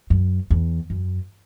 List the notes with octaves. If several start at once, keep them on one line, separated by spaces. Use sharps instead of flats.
F#2
E2
F#2